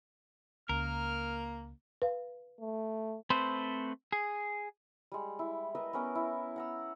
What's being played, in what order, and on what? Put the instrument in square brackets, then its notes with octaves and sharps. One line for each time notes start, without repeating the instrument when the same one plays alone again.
[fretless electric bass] C#2 [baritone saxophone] A#3 [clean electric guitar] A#4 [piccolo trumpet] F6
[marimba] B4 F5
[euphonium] A3
[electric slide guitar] A3 C4 B4 C5
G#4
[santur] G3 G#3
E4
A#4 B4 D#5 E5
B3 C#4 A#4
E4
F#5 A#5 E6